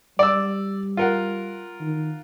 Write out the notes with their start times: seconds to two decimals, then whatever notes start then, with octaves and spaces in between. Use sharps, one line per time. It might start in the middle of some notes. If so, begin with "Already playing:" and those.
0.19 G3 D5 E6
0.97 F4 A#4 F#5
1.81 D#3